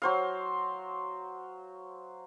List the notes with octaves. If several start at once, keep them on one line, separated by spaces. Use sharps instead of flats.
F#3 C5 F5